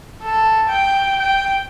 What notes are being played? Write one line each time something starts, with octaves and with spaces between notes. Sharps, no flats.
A4
G5
G5